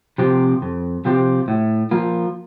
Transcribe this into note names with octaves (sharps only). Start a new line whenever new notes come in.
C3 F3 C4 G4
F2
C3 F3 C4 G4
A2
F3 A#3 F4